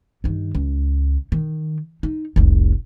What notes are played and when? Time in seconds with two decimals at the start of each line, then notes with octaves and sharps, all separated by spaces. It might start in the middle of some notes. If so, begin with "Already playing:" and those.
0.24 G2 D#3
0.55 C#2
1.32 D#3
2.03 D#4
2.36 F1 C2